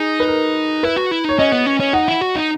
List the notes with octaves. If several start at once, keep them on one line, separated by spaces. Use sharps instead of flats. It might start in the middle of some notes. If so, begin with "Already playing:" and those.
Already playing: D#4 G#4
B4
A#4
E4 B4
F#4
E4
D#4 C#5
C#4 D#5
B3
C#4
C#4
D#4 F#5
E4
F#4
D#4